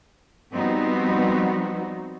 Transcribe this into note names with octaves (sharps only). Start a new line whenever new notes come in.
F3 G3 B3 C4 D#4 F#4